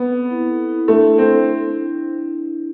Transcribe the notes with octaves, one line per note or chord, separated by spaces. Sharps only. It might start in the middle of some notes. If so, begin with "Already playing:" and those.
Already playing: B3 C4 A4
C4
E4
A4
E4
A3 D4
D4
C4
D4